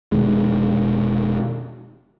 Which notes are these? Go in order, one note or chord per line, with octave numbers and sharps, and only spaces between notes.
F1 B2 D#3 G#3